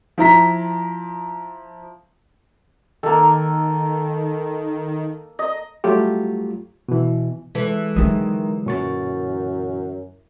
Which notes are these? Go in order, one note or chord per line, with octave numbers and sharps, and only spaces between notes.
F3 E4 A#5 B6
D#3 A#3 A4
D#5
F#3 G3 A3 F4 G4
B2 E3
E3 G#3 A4
D3 D#3 F#3 G#3 D#6
F#2 A#2 C#6 A6